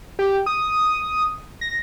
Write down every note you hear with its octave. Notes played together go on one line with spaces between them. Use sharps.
G4
D#6
A#6